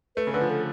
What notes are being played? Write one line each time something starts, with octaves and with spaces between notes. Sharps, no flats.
A3 B4
C#3
D3 B4
F3
A4